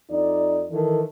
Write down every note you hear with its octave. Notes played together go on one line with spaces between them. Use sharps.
F2 D#4 D5
D#3 E3 A4